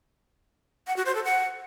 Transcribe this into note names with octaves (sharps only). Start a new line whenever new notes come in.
F#5
F#4
C5
A4
F#5